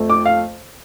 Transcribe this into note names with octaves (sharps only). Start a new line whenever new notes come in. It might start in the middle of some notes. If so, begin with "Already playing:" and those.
Already playing: F2 F3 A3
D6
F5